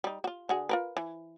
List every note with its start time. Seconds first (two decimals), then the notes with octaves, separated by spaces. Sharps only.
0.04 G3 D#4
0.24 F4 F#4
0.49 D3 F#4 G#4
0.69 F4 A#4 B4
0.97 E3